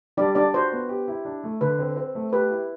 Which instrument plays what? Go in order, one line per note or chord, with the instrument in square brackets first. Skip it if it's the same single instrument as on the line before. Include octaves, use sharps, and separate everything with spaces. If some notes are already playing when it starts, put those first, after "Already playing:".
[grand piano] G3 [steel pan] D4 D5
[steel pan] D4 D5 [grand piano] G4
[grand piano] F#4 [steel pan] C5
[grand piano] B3
G4
E4
D4
A3
[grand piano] D3 [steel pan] B4
[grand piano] C4
C4
A3
[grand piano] G4 [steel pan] B4
[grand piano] E4